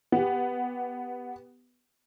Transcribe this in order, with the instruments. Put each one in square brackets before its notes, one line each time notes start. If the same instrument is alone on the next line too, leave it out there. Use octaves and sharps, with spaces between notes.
[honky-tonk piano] B3 G4